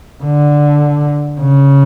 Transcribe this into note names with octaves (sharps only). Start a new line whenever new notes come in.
D3
C#3